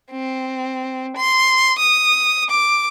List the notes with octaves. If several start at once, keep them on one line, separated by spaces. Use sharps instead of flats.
C4
C6
D#6
D6